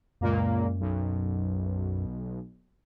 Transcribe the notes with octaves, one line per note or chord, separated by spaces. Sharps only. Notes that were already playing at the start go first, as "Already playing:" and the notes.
C#2 F#2 A#2 A#3
B1